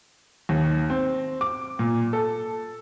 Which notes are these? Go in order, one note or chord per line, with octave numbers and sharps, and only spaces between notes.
D#2
C4
D6
A#2
A4